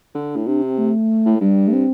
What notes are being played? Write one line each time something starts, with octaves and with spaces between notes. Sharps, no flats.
D3 D4
A2
C3 D4
C4
A3
A2
G2 G3
A3
C4